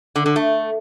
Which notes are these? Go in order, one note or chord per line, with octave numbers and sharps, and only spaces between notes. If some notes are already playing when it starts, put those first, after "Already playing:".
D3
D3
A3